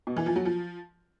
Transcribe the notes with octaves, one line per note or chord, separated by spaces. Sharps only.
B2
E3
F3
F#3
F3